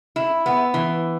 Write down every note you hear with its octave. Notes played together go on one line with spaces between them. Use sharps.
E4
B3
E3